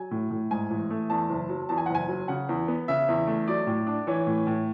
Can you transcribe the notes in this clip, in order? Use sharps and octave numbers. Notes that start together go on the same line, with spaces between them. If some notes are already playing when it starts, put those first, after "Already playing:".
Already playing: F#3 G#5
A2
A2
G#2 G#5
A1
A3
E2 A5
F#1
F#3
E2 A5
G#5
F#5
F#1
G#5
F#3
C#3 F#5
E2
B3
C#3 E5
E2
A3
F#3 D5
A2
D4
E3 C#5
A2
A2